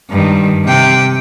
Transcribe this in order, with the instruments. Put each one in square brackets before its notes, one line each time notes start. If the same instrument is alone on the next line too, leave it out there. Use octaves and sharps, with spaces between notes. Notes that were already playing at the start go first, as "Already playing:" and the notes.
[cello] G2 D#3
C3 G5